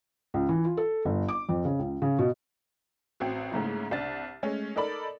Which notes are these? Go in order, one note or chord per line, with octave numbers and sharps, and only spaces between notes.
C#2
E3
F4
A4
G1
D6
F2
C#3
C#2
C#3
B2
A1 C4 F#4
G#2 C#3 A3 A#3 E4
C2 D4 A6
G#3 A3 C#4
D#4 A4 A#4 D5 B5